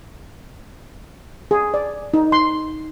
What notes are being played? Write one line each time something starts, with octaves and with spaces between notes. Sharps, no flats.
G#4
D5
D#4
C6